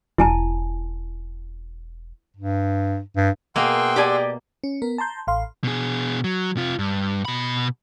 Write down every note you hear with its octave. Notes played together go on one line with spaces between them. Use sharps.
E1 E4 G#5 A5
G2
G2
B2 A#3 G#4 F#5 G5 C6 E6
G4 D5 G#5
C#4
B3 A#4
A5 A#5 C6 G6
A1 F5 C6
B2 G#4
F#3
C3 F4
G2
B2 B5